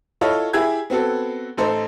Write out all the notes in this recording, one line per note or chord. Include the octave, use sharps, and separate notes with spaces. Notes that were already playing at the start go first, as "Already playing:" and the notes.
E4 F4 A4 C#5 D#5
E4 G4 G#4 E5 G#6
B3 C4 F#4 A4
A1 D#4 A4 C5